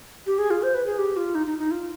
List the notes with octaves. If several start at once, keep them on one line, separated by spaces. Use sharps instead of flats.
G4
G#4
F4
C5
B4
G#4
G4
F4
D#4
D#4
D#4
F4